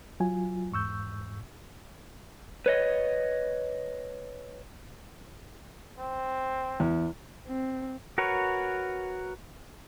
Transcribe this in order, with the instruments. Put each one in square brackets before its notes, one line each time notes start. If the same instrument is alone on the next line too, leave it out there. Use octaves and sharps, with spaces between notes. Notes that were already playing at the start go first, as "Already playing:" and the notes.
[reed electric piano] F#3 F4 G#5
E2 G#2 C#6 E6 G6
[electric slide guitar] B4 C#5 D#5
[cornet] C4
[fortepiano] E2
[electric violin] C4
[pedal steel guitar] F#4 A#4 B4 C#5